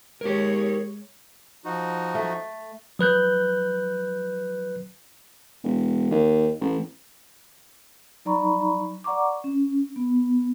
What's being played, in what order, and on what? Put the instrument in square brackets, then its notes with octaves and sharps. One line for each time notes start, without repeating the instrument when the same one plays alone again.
[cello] G#3 C#5 [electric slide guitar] G4 A#4
[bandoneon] F3 D#4 F#4
[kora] A3
[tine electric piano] F#3 B4 F#6 G6
[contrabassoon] E1
D#2
A1
[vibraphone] F#3 D#4 D5 A#5 B5 C#6
D5 F#5 A#5 C#6 D6
C#4
B3